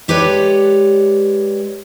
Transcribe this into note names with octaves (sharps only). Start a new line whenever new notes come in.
G#3 G4 A4 B4 C#5 D5